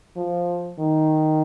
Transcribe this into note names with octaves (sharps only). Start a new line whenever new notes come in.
F3
D#3